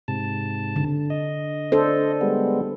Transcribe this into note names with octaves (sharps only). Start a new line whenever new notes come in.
G#2 C3 A5
D3
D#5
D4 A4 C5
G3 G#3 B3